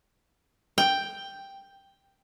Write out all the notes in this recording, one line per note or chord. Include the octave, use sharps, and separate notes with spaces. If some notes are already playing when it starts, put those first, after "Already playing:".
G5